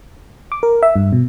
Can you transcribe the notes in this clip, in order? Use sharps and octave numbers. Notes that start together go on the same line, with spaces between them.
D6
A#4
E5
G2
B2